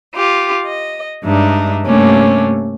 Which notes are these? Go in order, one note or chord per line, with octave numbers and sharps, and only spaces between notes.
F4 G4
D#5
G2 G#3 D4 D#4 E5
G2 C3 A3 A#3 C#4 D4